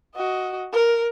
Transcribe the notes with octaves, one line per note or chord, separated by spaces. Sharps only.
F#4 D#5
A#4